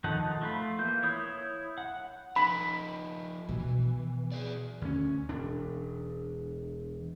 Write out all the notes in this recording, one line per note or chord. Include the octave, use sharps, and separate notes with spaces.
D#3 F3 D#4 A4 F#5
A3 F4 B5
E3 A#3 G6
E4 C#5 D#6 G6
F#5
F3 D#4 B5
B2 E3
G#4 B4 D5
D2 C#4
E1 D4